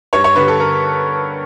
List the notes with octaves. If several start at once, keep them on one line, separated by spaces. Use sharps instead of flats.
G2 C#5
C#5
D3 G3 B4
A4
A#4